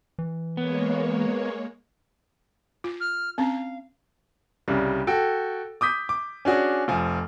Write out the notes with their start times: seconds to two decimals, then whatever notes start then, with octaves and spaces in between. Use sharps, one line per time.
0.19 E3
0.57 G#3 A#3 B3 C#5
2.84 F4
3.00 F6
3.38 C4 C#4 F5
4.68 C2 C#3 G3
5.07 F#4 A4 G5
5.81 D6 D#6 G6 B6
6.09 D6
6.45 C#4 D4 F#4 G#4
6.88 F1 F3 G#5